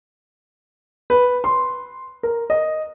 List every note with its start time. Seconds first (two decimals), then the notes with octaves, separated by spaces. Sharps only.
1.10 B4
1.44 C6
2.23 A#4
2.50 D#5